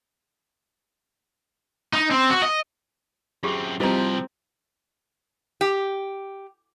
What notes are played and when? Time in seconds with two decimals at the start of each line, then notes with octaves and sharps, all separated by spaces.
1.93 D#4
2.11 C4
2.30 F#4
2.42 D#5
3.43 F#2 C4 F4 G4 G#4
3.80 C3 F3 G3 C4 E4 F4 D#5 A#5
5.61 G4